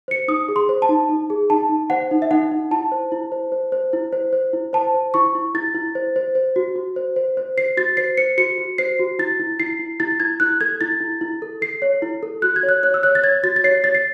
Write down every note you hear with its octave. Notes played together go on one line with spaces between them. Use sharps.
C5 C#7
D#4 D#6
G#4
C6
C5
A5
D#4
D#4
G#4
D#4 A5
D#4
C5 F#5
D#4
E5
D#4 F#5
D#4
E4 A5
C5
E4
C5
C5
C5
E4
C5
C5
E4
C5 A5
C5
E4 C#6
E4
E4 A6
E4
C5
C5
C5
F#4
F#4
C5
C5
C5
C5 C7
F#4 A6
C5 C7
C5 C#7
F#4 C#7
F#4
C5 C7
F#4
E4 A6
E4
E4 C7
E4
E4 A6
E4 G#6
E4 F#6
A4 G#6
E4 A6
E4
E4
A4
A4 C7
C#5
E4
A4
F#4 F#6
G#6
C#5
F#6
C#5 F#6
E6
C#5 F#6
A6
C#5 G#6
F#4 A6
A6
C#5 C7
C#5 A6
C7